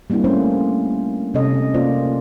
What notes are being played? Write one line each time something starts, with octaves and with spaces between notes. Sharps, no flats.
G3 A#3 C4 D4 E4
A3 A#3 C#4 C5
C3 C#4 A4 D#5
A#3 C#4 F4 C5 D5